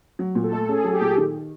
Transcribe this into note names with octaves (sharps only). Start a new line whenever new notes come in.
F#3
A#2
A4
A3
C#4 G#4
F#3
G4
A#2
D#3 G4